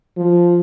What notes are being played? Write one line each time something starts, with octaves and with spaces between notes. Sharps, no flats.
F3